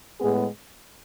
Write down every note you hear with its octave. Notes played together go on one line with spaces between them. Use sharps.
A2 G#3 B3 G#4